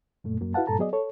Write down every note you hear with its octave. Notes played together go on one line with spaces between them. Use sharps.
F#2 A#2 A3
F#2 F#3 A#3
E4 F#4 B4 F5 F#5 A5
G2 A#2 A4 A5 A#5
F#3 B3 G#4 D5 D#5
A4 C#5